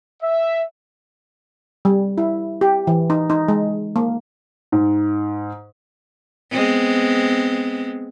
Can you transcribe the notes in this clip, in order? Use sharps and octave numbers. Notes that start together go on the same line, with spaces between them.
E5
G3
E4
G4
E3
D#4
D#4
G#3
A#3
G#2
G#3 B3 C4